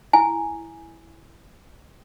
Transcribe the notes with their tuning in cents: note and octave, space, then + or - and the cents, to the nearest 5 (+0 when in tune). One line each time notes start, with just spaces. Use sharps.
E4 +0 G#5 +0